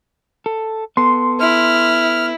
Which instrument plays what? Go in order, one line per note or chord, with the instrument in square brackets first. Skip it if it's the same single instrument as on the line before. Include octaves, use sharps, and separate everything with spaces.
[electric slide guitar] A4
[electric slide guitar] B3 A4 [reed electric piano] C6
[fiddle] E4 [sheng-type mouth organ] F6